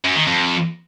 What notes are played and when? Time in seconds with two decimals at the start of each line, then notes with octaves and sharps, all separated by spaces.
0.04 F#2
0.16 D#3
0.27 F2